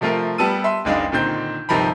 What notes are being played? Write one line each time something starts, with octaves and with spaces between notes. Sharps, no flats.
C3 F3 A3 F4 A#4
G3 B3 A5 E6 D#7
E5 C6
F#1 C#2 G#3 D4 D#4 F5
A#2 D3 D#3 C4 G6
G1 C3 D#3 F3 A#5 B5